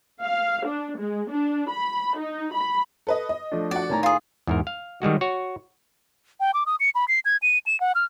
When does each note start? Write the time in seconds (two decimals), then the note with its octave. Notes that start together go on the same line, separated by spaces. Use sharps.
0.23 F5
0.65 D4
0.98 G#3
1.30 D4
1.69 B5
2.17 D#4
2.53 B5
3.07 A4 B4 D#5
3.29 D#5
3.52 F3 A3 D4
3.71 F#4 D5 F#5
3.89 A2 D#3 C#5 G#5 A#5
4.03 F4 G#4
4.47 E2 G#2 A#4
4.67 F5
5.02 D#3 G3 G#3 F#4
5.21 F#4 C#5
6.40 G5
6.54 D6
6.66 D#6
6.80 C#7
6.95 B5
7.08 C7
7.25 G#6
7.42 D#7
7.66 E7
7.80 F#5
7.95 F6